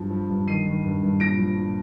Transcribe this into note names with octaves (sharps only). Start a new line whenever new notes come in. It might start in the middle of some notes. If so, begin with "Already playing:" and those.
Already playing: G2 F3
F3
G2
D#3 C7 D#7
D#3
G2
G2
A#2 A#6 D7
F3
A#2